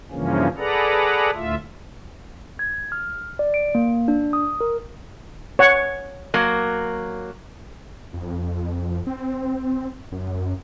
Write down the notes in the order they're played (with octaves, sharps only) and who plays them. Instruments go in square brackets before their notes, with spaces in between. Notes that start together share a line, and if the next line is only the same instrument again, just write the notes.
[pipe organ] G2 C#3 E3 F3 A#3 C#4
G#4 A4 B4 D5 F#5 A#5
D2 A2 F4 E5
[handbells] G#6
F6
D5
D7
A#3
D4
D#6
A#4
[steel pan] C#5 F#5
[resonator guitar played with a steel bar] F#3 A#3
[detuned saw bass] F2
C4
F#2